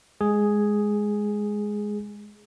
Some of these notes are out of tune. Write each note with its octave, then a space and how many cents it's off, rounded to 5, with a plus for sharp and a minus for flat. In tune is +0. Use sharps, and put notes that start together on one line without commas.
G#3 +0 G#4 +0